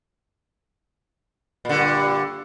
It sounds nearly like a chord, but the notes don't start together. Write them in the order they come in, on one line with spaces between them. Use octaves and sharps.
A#2 D3 G2